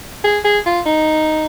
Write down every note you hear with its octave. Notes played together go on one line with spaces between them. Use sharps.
G#4
G#4
F4
D#4